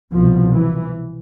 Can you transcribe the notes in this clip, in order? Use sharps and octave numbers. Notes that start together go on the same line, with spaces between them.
C2 B2 F3
E3